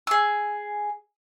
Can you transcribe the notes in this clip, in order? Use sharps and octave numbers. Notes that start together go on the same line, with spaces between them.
G#4 E6